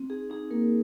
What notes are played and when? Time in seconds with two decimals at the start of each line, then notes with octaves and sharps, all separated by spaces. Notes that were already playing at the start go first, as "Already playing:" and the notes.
Already playing: C4
0.10 D#4 G#4
0.30 D#4 G#4
0.51 A#3 A#4